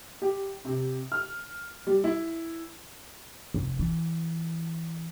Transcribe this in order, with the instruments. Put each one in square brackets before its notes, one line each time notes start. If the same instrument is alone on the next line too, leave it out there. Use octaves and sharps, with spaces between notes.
[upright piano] G4
C3
F6
G3
E4
[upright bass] F1
E3